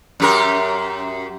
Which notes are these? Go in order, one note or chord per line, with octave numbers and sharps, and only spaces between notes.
F#2 G4 A#4